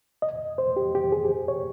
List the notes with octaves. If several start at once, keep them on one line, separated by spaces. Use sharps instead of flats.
D#5
C5
G4
G4
G#4
C#5